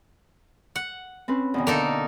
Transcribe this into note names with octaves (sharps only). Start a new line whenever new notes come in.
F#5
C4 C#4 B4
E2 B2 D#3
D3 A#3 D#4 A4